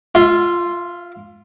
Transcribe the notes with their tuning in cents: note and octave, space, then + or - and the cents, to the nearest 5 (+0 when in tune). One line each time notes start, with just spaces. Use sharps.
F4 +0 E5 +35